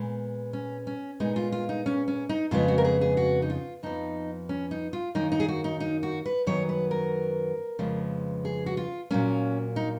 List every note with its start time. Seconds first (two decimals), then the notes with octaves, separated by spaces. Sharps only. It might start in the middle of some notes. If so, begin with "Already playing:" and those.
Already playing: A#2 G#3 B3
0.53 C#4
0.87 C#4
1.20 A#2 G#3 B3 D#4
1.36 F4
1.52 F4
1.69 D#4
1.86 C#4
2.08 C#4
2.29 D#4
2.51 F2 C#3 G#3 B3 F4
2.68 F#4
2.78 A#4
2.85 G#4
3.01 G#4
3.17 F#4
3.42 D#4
3.50 F4
3.83 F2 F3 B3 D#4
4.49 C#4
4.71 D#4
4.93 F4
5.15 F#2 D#3 A#3 D#4
5.32 D#4
5.40 G#4
5.48 F#4
5.64 D#4
5.80 D#4
6.03 F#4
6.26 B4
6.46 F#2 D#3 F#3 B3 C#5
6.69 B4
6.91 A#4
7.79 F2 C#3 F3 G#3 B3
8.45 G#4
8.66 F#4
8.77 F4
9.10 A#2 F#3 A#3 C#4
9.76 D#4